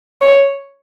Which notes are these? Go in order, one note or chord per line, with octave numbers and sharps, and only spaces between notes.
C#5